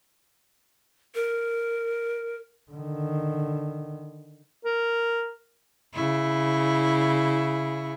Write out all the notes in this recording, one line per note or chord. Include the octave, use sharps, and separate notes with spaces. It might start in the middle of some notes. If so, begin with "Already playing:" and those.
A#4
D3 D#3
A#4
C#3 E4